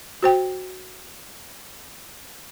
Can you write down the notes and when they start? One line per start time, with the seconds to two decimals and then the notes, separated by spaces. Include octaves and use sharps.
0.23 F#4 C5 G5